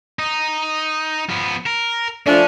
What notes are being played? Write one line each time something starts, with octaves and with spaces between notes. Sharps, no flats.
D#4
F3 B3
A#4
F3 A3 C#4 D4